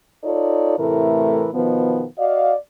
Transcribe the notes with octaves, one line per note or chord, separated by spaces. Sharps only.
D#4 F4 A4 C#5 D5
A2 C3 E3 A3 A#4
B2 D#3 F3 B3
F#4 D5 D#5 F5